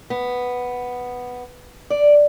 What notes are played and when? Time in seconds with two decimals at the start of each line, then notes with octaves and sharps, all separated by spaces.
0.10 B3
1.90 D5